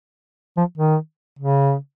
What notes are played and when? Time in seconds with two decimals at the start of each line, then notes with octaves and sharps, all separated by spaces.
0.57 F3
0.78 D#3
1.39 C#3